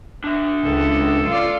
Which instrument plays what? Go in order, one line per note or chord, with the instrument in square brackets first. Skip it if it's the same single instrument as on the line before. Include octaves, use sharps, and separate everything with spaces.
[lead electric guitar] D4 E5
[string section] C#2 [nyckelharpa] A4
[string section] F4 D5